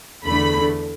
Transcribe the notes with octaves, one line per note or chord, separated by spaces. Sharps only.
E2 D3 A3 B5